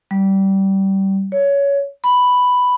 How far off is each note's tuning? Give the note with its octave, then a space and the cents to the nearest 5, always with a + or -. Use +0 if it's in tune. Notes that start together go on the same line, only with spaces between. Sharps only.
G3 -20
C#5 +15
B5 +5